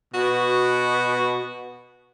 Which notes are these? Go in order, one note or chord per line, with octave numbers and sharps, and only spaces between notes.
B2 F#4